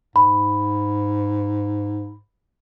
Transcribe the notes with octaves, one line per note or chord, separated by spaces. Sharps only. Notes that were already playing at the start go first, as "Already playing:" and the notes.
G#2 B5